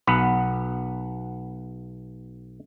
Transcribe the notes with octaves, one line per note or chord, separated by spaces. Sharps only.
B1 B3 B4 F#5